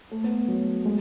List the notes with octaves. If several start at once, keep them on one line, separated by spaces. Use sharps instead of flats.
A3
B3
F#3
G#3